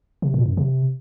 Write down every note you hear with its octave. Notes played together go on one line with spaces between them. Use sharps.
C3
A#2
F#2
C3